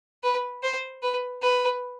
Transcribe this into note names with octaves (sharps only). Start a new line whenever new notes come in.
B4
C5
B4
B4